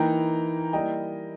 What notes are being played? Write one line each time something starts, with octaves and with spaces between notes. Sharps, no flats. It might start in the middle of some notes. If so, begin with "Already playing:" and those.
Already playing: E3 A#3 D#4 G5 A#5
G3 A#3 E4 D#5 G5